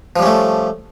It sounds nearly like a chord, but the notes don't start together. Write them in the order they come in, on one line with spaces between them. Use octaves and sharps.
F3 G3 C#4 A3